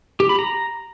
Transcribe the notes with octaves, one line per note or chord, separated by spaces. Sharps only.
G4
B5
A#5